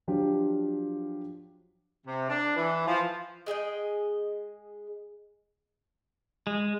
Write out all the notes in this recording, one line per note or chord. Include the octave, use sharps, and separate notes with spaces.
F3 F#3 D4 F4 G4
C3
D4
E3
F3
G#3 G#4 D#5 G5
G#3